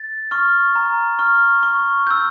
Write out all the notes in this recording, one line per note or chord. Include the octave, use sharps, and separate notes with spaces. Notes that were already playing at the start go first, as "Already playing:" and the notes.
Already playing: A6
C#6 F6
A#5
C#6 F6
C#6
E6 G6